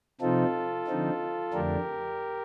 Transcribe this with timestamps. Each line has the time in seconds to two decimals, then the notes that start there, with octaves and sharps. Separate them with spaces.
0.21 C3 F3 C4 D#4 F4 A4
0.87 D3 F3 C4 D#4
1.53 F2 D3 A3 D4 G4 A#4